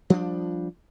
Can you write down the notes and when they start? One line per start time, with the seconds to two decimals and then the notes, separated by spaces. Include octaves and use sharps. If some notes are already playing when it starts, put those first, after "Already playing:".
0.10 F3 G3 B3 D4